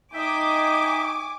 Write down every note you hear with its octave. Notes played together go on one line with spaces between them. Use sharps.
D#4 D#5 E5 G5 G#5 D6